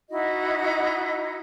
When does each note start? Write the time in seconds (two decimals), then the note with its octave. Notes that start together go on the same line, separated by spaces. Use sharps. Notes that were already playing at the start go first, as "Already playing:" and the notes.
0.10 D#4 E4 F#4 D#5